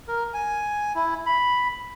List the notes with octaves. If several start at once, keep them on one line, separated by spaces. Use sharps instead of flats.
A#4
G#5
E4
B5